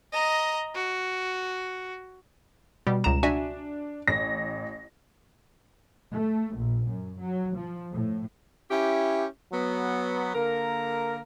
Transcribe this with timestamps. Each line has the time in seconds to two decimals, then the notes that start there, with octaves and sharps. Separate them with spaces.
0.13 D#5 A#5
0.75 F#4
2.87 B2 G3
3.04 C#2 A#5 E7
3.23 D4 F#4 E5 G#5
4.08 A1 A#6
6.11 A3
6.56 A#1
6.88 F#2
7.19 F#3
7.56 F3
7.92 A2
8.70 C#4 E4 G4
9.52 F#3 B3
10.34 D3 A#3 A#4